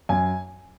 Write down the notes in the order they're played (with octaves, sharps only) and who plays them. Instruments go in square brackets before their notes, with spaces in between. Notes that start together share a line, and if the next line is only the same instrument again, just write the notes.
[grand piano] F#2 G#5